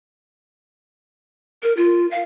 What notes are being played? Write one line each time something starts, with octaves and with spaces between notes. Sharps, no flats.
A#4
F4
F5